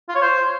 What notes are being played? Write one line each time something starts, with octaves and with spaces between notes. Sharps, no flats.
F4
C#5
C5